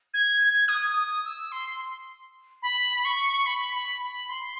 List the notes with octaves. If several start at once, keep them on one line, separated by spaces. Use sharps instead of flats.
G#6
G#6
D#6
D#6
E6
C6
B5
C#6
B5
B5
B5
C6